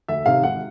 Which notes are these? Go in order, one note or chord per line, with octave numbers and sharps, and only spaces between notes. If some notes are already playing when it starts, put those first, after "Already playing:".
D2 E5
C3 D#3 F5
G#1 F#5